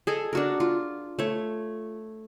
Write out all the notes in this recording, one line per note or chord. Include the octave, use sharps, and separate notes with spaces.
G#4 A4 D#5
D4 F#4 A#4
F4
A3 C#5